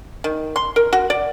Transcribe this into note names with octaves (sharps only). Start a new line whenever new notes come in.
D#3
C6
A#4
F#4
D5